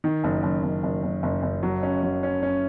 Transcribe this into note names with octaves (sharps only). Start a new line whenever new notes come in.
D#3
F#1
F#1
F#1
F#1
F#1
F#1
F#1
F#3
C#4
F#3
C#4
C#4